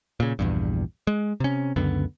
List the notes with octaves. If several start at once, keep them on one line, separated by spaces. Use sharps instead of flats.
A#2 C#3
A#1 E2 G2
G#3
C3 C#4
C#2 F#2 D3 B3